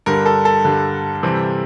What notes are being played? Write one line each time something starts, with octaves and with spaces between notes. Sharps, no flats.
G2 D3 G3 A#4
A4
A4
G2 D3 G3
C3 E3 G3 C4